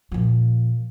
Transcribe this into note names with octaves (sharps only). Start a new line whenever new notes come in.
A#2 F3